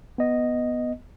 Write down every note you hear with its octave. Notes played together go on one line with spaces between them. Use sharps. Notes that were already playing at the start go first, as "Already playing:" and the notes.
B3 D#5